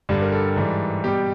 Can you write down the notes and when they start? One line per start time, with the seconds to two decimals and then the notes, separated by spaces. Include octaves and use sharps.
0.09 G2 D3 G3
0.22 A#4
0.32 A4
0.56 G#2 E3 G3
1.04 B2 G3 G4